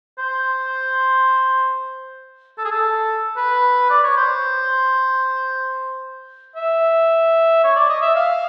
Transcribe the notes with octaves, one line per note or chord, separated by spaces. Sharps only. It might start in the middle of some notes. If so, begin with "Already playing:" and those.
C5
A4
G#4
A4
B4
D5
C#5
C5
E5
C#5
D5
D#5
E5
F5